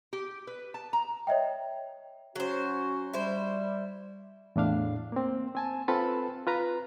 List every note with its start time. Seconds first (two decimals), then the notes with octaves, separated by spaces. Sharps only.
0.13 G4
0.47 B4
0.74 A5
0.93 A#5
1.27 C#5 D#5 E5 G5
2.36 F#3 C#4 F#4 C5
3.14 G3 E4 C5
4.56 E2 A2 D4 F5
5.12 A#3 C4
5.55 C4 G#5 A5
5.88 C4 F4 A4 B4 A5 B5
6.47 F4 B4 A#5